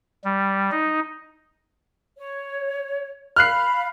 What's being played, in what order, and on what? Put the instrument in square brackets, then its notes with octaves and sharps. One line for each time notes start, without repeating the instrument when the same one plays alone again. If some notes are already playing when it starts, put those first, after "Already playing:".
[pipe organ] G3
D#4
[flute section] C#5
[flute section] F5 B5 [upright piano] F6 F#6 C7